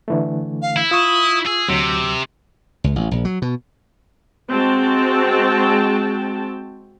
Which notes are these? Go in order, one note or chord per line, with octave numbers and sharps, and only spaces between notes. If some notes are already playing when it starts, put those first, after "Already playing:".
D3 E3 A3
F5
E4
F4 C#6 D#6
G#4 E6
D2 C3 F#3
C#2
A1
A#1
F#3
B2
G#3 C4 F#4 G5 A5